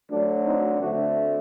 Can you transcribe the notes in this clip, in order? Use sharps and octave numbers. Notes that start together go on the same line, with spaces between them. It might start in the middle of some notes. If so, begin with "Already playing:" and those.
D2 D3 F#3 D4
C4 D#4
D2 D3 A3 C4 D4 F#4